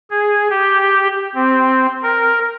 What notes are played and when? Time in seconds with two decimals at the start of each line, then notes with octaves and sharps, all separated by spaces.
0.11 G#4
0.50 G4
1.35 C4
2.03 A#4